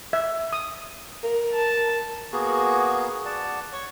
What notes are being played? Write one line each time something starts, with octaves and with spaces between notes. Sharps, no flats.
E5
D#6
A#4
A5
A#3 B3 F#4 G#4
D5 F#5 A5
C#5 C#6